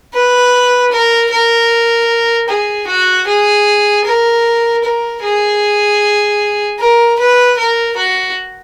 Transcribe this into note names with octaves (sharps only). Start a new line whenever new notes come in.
B4
A#4
A#4
G#4
F#4
G#4
A#4
A#4
G#4
A#4
B4
A#4
F#4